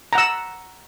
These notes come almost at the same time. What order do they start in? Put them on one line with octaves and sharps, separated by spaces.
A#5 F#5 E6